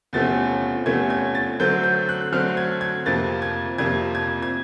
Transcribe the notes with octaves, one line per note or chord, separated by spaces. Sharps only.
E2 C3 F3 A3 C#4 A6
E2 C3 F3 A3 C#4 G#6
G#6
A6
D3 F#3 A3 C4 G6
G6
F#6
D3 F#3 A3 C4 F6
G#6
G#6
F2 C3 F3 A#3 A6
G#6
F2 C3 F3 A#3 G#6
G#6
G#6